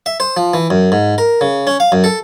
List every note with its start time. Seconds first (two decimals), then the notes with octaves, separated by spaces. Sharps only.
0.06 E5
0.20 C5
0.37 F3
0.54 E3
0.70 F#2
0.92 G#2
1.18 A#4
1.41 C#3
1.67 C#4
1.80 F5
1.92 F#2
2.04 A4